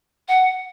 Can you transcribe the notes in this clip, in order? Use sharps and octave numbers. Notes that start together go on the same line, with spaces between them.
F#5